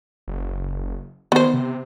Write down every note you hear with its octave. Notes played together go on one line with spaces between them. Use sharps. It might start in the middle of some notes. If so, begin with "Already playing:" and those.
F#1
D#3 B3 C5
C3